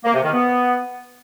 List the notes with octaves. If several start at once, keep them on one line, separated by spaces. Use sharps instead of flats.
A#3
C3
D#3
B3